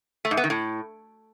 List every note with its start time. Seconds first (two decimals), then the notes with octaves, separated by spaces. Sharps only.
0.25 A3
0.31 G#2
0.37 B3
0.44 D#3
0.50 A2